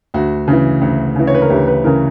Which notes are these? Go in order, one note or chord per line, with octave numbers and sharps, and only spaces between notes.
D2 F#4
C#3 E3
D2
C#3 E3
C#5
B4
A#4
D2 G4
B4
C#3 E3 A#4